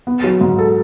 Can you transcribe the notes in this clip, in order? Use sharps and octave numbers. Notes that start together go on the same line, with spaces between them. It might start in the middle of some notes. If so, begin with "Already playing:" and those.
B3
F#3
G#2
A4